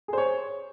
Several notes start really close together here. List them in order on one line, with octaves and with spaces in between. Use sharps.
G#4 C5 C#5